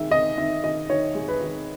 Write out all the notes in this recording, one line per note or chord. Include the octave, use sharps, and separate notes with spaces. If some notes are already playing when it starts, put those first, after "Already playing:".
Already playing: D#3 G#3 E5
D#3 D#5
D#3 E5
D#3 D#5
D#3 C#5
G#3
B4
D#3